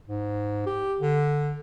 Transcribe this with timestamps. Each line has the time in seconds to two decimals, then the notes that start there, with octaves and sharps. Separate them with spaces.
0.08 G#2
0.66 G4
1.01 D3